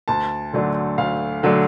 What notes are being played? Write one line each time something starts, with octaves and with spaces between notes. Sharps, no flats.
D2 A5
D3 F#3 A3 D4
D2 F5
D3 F#3 A3 D4